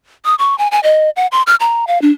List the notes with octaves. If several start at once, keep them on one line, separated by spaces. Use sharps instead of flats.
D#6
C#6
G#5
G#5
D#5
F#5
C6
F6
A#5
F5
D4